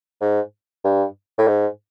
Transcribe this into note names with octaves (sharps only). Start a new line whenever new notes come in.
G#2
G2
A2
G#2